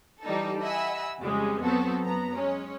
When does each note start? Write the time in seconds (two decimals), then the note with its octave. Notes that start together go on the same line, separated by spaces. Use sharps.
0.22 E3 G3 D#4 A4
0.61 D#5 E5 F#5 G#5 B5 E6
1.20 F2 C#3 G3 G#3 C#4
1.63 F#3 B3 C4 F#4 A4
2.03 F#2 B3 A#5
2.36 G#3 C#4